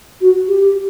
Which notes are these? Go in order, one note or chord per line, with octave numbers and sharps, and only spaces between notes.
F#4
G4